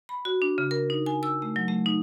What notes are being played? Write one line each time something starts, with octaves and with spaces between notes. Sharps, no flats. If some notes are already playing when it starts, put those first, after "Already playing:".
B5
F#4
D4
C#3
A#4
D#4
G#5
E6
A3
F#3
A3
D#4